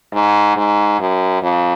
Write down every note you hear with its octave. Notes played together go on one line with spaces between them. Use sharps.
G#2
G#2
F#2
F2